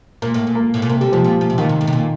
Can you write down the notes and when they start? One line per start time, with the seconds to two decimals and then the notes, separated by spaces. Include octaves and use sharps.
0.22 A#2 A#3
0.34 A2
0.47 A#2
0.55 A#3
0.74 A2
0.82 A#2
0.89 C3 A#3
1.01 D3 G3
1.12 C3 F3
1.24 A#2
1.41 A#2
1.50 C3
1.58 A#2 D#3
1.69 C3
1.81 A2
1.87 C3
1.93 A#2